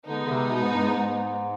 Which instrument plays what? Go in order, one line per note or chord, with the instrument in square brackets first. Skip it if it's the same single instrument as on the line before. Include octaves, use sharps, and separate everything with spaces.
[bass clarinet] D3 [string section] G#3 B3 D#4
[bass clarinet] D3
C3
B2
G#2
G2
G#2